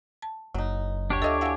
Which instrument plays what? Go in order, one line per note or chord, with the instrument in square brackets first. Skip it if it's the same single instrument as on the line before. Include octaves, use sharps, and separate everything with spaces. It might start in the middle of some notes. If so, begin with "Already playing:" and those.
[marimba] A5
[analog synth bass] F#1 [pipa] F#3 D#4
[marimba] D2 [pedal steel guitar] D4 G4 C#5
[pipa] F4 D#5 E5 [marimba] A4 C#6
[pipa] E4 F#4 E5 [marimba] F5 G#5